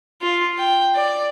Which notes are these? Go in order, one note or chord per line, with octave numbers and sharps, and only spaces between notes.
F4
G5
D5